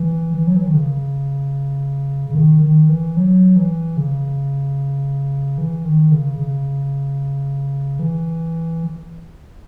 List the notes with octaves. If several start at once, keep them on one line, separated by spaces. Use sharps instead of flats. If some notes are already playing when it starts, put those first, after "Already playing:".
Already playing: E3
E3
F#3
E3
D#3
C#3
C#3
D#3
D#3
E3
F#3
E3
C#3
E3
D#3
C#3
C#3
E3